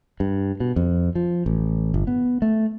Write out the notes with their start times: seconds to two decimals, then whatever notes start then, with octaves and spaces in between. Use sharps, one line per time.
0.20 G2
0.60 B2
0.76 F2
1.15 F3
1.46 A1
1.94 G1
2.07 B3
2.42 A3